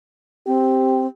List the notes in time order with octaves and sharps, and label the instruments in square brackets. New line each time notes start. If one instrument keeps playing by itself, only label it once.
[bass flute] C4 [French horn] G4